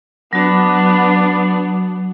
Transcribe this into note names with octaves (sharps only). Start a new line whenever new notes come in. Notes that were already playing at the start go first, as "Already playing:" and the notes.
F#3 B3 D4 F#4